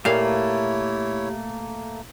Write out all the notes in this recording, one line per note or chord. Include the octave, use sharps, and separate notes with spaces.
A#2 A3 A#3 E4 G4 C#5 F5